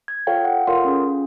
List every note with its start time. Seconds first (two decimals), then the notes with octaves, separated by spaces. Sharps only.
0.08 G#6
0.27 F4 A4 C#5 F5 G5
0.45 F#5
0.67 F4 A4 A#4 C#5 F5 C6
0.85 C#4 G#4